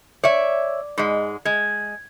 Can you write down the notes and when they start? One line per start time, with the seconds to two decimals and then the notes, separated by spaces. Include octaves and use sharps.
0.24 C#5 D5 E5 G#6
0.98 G#2 G#3
1.45 G#3 G#6